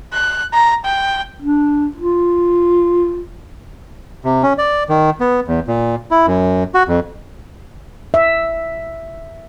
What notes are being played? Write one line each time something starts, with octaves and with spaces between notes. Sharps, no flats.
F#6
A#5
G5
D4
F4
C3
C#4
D5
D#3
B3
E2
A#2
E4
F#2
F#4
F2
E5